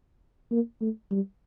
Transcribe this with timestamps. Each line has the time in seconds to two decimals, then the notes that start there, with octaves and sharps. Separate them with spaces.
0.51 A#3
0.81 A3
1.11 G3